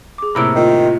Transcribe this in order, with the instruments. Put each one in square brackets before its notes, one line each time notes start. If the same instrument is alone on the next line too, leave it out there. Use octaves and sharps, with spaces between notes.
[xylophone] G#4 D6
[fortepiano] A2 C3 A#3 [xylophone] B5 E6 D7
[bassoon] D#3 [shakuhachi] F4